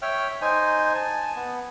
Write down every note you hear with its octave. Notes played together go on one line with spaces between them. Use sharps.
C#5 E5 G5 F6
D#4 C5 G#5
G#5 A5
B3